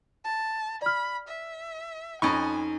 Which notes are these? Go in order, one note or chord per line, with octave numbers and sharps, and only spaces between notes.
A5
D5 B5 F6
E5
F2 C#4 D#4 G#5 B5 C#6